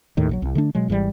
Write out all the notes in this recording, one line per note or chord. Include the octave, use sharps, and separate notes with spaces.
D#2 A2 D#3
A#1 D3 F#3
C2
D3 A3 D4
B2 F#3 G#3
G#1 G#2 E3 G3